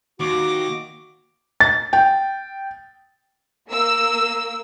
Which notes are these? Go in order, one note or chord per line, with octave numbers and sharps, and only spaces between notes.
D#2 F#4 D6 A#6
A6
G5
A#3 E6